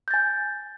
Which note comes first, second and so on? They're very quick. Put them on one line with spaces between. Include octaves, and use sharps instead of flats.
G6 A6 G#5